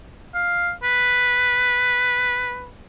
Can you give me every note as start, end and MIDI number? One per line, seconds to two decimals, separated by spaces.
0.34 0.71 77
0.83 2.69 71